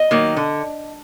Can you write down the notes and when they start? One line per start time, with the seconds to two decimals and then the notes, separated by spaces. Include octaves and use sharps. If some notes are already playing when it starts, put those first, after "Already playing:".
Already playing: D#5
0.11 D#3 F#3 A#3
0.37 D3